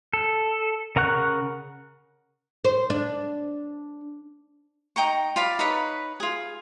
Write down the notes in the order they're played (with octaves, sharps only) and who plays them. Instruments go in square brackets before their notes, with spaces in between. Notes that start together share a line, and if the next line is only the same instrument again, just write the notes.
[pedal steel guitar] A4
C#3 A#4 F#5 C#6 F#6
[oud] C5
D4
[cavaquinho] D#4 G5 A#5 C#6
F4 D5 F5 B5
D#4 B4 C#5 B5
F4 G#4